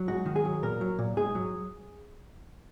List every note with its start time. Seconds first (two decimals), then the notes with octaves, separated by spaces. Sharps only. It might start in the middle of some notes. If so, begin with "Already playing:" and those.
Already playing: F#3
0.08 G#2 F#4
0.26 D#3
0.36 G#4
0.45 F#3
0.63 A#2 A#4
0.81 F#3
0.99 A#2
1.17 G#2 G#4
1.35 F#3